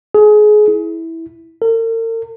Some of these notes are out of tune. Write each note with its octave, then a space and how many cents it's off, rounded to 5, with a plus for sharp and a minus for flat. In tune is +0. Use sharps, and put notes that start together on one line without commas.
G#4 +25
E4 -10
A#4 -45